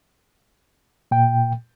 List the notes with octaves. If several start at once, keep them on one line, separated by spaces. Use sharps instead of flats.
A#2 G5